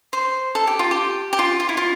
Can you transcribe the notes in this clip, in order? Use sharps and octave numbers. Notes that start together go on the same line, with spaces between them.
C5
A4
G4
F4
G4
G4
F4
F4
E4
F4